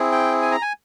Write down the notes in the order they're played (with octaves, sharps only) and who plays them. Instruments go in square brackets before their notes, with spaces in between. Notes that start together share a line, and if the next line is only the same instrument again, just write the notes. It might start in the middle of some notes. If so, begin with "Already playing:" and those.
Already playing: [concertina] C4 E4 G#4
G5
G#5
A#5
G#5